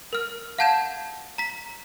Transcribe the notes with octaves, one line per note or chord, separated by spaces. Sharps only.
A#4 F6
F5 F#5 A5 G6 G#6 E7
A#5 B6